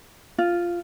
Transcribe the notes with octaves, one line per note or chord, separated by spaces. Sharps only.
F4